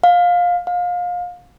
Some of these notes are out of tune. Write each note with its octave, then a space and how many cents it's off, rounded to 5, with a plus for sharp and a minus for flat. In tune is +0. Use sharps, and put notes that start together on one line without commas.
F5 +20
F5 +30